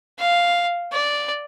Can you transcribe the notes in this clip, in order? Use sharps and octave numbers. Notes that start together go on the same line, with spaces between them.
F5
D5